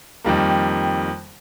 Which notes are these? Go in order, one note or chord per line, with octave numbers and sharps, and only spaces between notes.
F2 D#3 G3 A#3